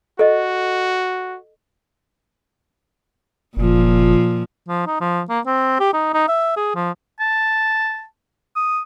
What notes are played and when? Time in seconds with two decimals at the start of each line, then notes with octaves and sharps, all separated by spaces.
0.19 F#4 A4 D#5
3.57 F#1 A#2 F3
4.68 F3
4.87 D#4
5.01 F3
5.29 A#3
5.46 C4
5.80 G4
5.94 D#4
6.13 D#4
6.28 E5
6.57 G#4
6.75 F3
7.20 A5
8.56 D#6